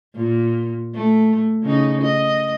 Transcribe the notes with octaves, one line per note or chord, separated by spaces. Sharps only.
A#2
A3
C#3 D#4
D#5